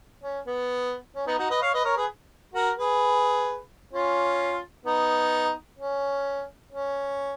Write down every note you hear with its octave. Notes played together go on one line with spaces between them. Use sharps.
C#4
B3
C#4
B3 D#4
D#4 F#4
B4 D#5
C#5 F5
B4 D#5
A#4 C#5
G#4 B4
F#4 A#4
G#4 B4
C#4 F4
B3 D#4
C#4
C#4